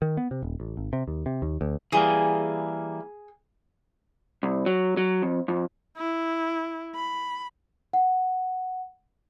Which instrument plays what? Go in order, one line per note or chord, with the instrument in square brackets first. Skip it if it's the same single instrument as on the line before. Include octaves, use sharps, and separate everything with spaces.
[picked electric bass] D#3
B3
C3
D#1
A1
G#1
C3
D#2
C3
D#2
D2
[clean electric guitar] E3 G3 A#3 [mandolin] G#4
[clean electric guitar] C2
F#3
F#3
F2
F2
[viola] E4
B5
[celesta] F#5